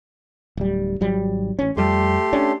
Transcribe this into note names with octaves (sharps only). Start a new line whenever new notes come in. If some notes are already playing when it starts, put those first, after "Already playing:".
D1 G3
G#1 F#3 G3
A1 C#4
F2 G3 A3 G4 C6
C#4 D4